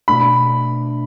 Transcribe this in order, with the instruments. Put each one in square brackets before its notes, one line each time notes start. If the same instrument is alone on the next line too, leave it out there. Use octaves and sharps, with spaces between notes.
[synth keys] B2 A3 D4 [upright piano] B5